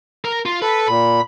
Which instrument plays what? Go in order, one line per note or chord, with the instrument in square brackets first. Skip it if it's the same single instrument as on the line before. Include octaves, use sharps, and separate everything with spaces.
[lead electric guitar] A#4
F4
[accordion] A4 [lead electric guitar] B4
[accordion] A#2 [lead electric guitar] B5